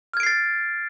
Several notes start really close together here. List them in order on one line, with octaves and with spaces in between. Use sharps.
F6 G#6 D7 C7 A6